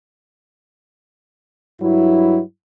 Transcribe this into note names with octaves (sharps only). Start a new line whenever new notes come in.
G2 F#3 E4